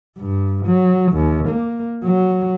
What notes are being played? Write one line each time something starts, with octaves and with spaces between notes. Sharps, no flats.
G2
F#3
D#2
A#3
F#3